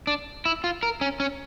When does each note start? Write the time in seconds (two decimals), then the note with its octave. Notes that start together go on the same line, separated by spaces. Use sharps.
0.07 D4
0.45 E4
0.64 F4
0.83 A#4
1.01 C#4
1.20 C#4